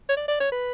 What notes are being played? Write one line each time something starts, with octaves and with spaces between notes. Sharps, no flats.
C#5
D5
D5
C#5
B4